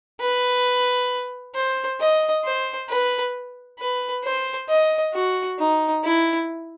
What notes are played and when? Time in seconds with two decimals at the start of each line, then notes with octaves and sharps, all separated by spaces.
0.20 B4
1.55 C5
2.00 D#5
2.44 C5
2.89 B4
3.79 B4
4.24 C5
4.69 D#5
5.14 F#4
5.59 D#4
6.04 E4